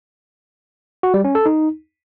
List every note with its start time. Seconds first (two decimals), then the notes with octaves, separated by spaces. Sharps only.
1.03 F#4
1.14 G3
1.24 C#4
1.35 A4
1.46 D#4